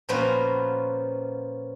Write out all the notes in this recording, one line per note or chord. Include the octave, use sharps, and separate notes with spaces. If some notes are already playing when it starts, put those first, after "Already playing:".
A#2 F3 A#3 B3 C#4 F#4